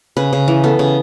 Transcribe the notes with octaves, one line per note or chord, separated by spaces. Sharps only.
C#3 B4
C#3
E3
B3 A4
C#3